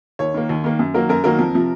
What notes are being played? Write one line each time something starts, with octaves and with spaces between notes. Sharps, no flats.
D#2 C#5
D#3 A#3
D#2
D#3 A#3
F#2
D#3 F#3 A#3 A#4
F#2 A#4
D#3 F#3 A#3 A#4
F2
C3 F3